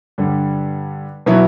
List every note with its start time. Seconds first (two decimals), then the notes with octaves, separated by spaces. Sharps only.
0.18 G2 D3 G3
1.26 B2 F#3 B3 E4